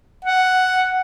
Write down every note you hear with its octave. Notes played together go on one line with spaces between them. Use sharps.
F#5